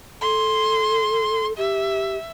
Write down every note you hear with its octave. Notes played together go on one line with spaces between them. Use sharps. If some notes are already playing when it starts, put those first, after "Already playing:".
A4 C6
G4 E5